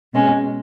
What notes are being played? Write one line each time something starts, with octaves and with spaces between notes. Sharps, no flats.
B2 G#3 C#4